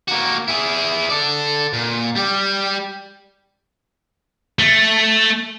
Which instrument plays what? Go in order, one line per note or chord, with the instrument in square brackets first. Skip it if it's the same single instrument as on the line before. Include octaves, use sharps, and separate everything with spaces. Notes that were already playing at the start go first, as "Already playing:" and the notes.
[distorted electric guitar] A#3 F#4
E4 G#4
A4 D5
A#2
G3 G4
A3